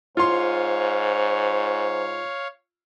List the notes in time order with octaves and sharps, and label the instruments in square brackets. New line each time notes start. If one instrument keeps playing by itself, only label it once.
[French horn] G#2 [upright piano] F4 C6 [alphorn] C5 [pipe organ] C#5 F5